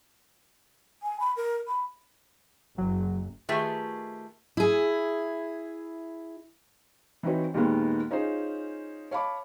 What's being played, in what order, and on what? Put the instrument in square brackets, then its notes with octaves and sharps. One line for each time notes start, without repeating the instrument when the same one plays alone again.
[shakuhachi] G#5
B5
A#4
B5
[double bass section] F#1 [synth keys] F#3
[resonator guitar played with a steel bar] D#3 A3 F4 G4 G#4 B4
[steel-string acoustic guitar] E4 G#4
[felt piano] E3 C4 D#4 F#4 B4 C#5
D#2 A#2 D#3 G#3 A#3 B3
C#4 D#4 F4 G#4 C5
C#5 F5 A5 B5 D6